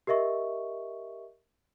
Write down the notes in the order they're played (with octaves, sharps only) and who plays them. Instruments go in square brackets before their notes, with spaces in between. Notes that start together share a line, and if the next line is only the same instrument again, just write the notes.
[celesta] G4 A#4 D#5 E5 C#6